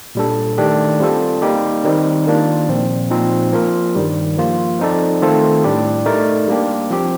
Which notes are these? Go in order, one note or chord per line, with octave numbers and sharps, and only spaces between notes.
A#2 G3 D4 A4
D#3 A3 D4 G4
G3 C4 F4 A4
G3 A#3 D#4 G4
D#3 G3 C4 D#4 A#4
D#3 A#3 D4 F4
A#2 F3 C4
A#2 F3 C4 D#4
F3 A#3 F4 A#4
G2 D#3 G3
F3 A#3 F4
F3 C4 D#4 A4 D5
D#3 A3 C4 F4 A4
A2 G3 D4 G4
A3 D#4 A#4 D5
G3 A#3 D4 G4
F3 C4 G4